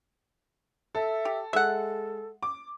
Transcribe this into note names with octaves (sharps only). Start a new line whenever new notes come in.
A4 E5
G4
G#3 A4 E5 F#5
D6